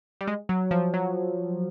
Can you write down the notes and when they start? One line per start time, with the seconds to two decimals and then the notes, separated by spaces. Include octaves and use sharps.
0.21 G3
0.27 G#3
0.49 F#3
0.71 F3
0.94 F#3